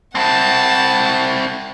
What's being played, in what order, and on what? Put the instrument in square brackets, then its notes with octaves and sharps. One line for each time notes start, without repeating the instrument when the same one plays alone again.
[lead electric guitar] C4 E4 [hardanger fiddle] F#5 A5